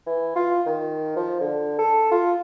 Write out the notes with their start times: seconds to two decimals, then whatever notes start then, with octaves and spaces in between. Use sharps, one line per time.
0.06 E3
0.35 F4
0.66 D#3
1.16 F3
1.40 D3
1.79 A4
2.12 F4